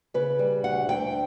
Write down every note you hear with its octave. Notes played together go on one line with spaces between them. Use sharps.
C#3 B4
G3
D2 F#5
D2 G5